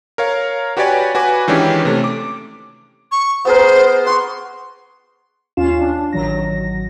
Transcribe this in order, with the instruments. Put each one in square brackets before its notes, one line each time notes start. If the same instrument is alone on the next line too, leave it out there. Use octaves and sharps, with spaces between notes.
[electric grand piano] A#4 C#5 F5
F#4 G4 B4 C#5 D5 G#5
F#4 B4 G#5 D6
D#3 E3 G#3 C#4 D4 G4
C3 A3 C#4
D6
[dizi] C#6
[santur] B3 G#4 A#4 [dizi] C5
[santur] F#5 C#6 [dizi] C6
[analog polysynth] D#2 C#4 F4 F5 E7
D4
A1 D#3 F#3 A#6